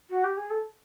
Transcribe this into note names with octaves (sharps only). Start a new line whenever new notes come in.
F#4
G4
G#4
A4